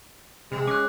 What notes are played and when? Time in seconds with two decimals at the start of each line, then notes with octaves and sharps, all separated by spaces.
0.52 C3 G#3
0.67 C#4 D6 F#6